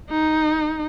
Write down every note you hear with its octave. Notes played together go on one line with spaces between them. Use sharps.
D#4